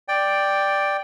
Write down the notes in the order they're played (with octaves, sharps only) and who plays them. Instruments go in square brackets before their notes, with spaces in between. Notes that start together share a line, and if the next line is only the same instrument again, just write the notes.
[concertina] D5 G5